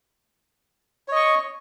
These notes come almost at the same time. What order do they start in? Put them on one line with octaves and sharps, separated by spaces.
C#5 D#5 C#6